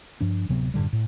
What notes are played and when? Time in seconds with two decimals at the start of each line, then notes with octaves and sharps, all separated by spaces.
0.21 G2 F3 D4
0.49 D1 C3 F#3 B3
0.74 F#2 A2 D3 G3
0.93 A2